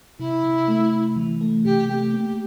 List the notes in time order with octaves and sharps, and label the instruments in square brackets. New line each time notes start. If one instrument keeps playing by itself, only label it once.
[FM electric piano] C3 [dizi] E4
[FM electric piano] C3
A3
C3
E3
A3
[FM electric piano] C3 [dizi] G4
[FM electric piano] A3 [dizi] G4
[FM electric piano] A#3